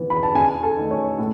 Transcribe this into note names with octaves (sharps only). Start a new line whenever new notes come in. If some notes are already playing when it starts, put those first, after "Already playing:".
Already playing: E3 B3
B5
A5
E2 G#5
A4
D#3 A3
C#5
A2